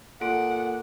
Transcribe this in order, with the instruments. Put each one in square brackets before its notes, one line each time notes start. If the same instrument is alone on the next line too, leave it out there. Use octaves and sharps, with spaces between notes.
[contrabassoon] A#2 [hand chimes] A4 D7 [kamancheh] F#5